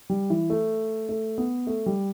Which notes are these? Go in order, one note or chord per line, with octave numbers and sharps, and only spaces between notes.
G3
E3
A3
A3
B3
A3
G3